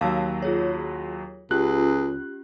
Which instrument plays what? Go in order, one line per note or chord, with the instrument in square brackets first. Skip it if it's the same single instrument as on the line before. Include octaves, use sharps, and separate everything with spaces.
[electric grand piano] D#2 F#3 [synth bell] F5 A5 E6
[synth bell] F4 G#4 C#5
[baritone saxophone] C#2 [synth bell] C#4 F4 G4 [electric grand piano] F#6